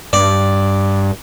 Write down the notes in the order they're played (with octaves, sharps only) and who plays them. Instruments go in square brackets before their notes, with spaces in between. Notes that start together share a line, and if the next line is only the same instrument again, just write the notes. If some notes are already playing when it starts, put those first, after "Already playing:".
[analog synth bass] G2 [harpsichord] D5